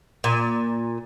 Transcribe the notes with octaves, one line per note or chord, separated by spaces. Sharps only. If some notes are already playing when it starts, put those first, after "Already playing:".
A#2